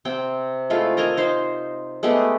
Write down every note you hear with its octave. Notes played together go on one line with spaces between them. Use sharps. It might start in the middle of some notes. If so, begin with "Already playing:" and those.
C3 C4 G5
G#3 A3 E4 F4
A#4 D#5 G#5 A#5
D#4 C5
G#3 A3 B3 G4